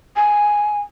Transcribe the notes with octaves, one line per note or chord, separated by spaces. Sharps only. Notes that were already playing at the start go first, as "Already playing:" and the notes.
G#5